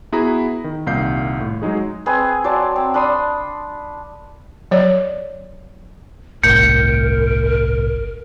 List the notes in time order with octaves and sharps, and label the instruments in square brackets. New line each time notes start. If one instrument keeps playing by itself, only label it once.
[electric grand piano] B3 E4 F#4 G#4 A#5 B5
D#3
C2 A#2 D#3 F5 G6 C7
A2
F#3 G#3 D#4 G#4
[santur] C4 G#4 B4 D#5
F#3 C5 D5 A5
C4
D4 B5 C6 D#6
[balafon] F#3 C#5 D5
[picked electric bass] G1 C2 A2 [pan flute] A#4 [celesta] G6 C#7